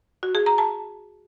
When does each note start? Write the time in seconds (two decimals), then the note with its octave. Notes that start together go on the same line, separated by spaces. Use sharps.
0.23 F#4
0.35 G#4
0.46 A#5
0.58 A5